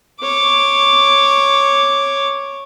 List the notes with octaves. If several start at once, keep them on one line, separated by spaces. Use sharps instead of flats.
C#5 D6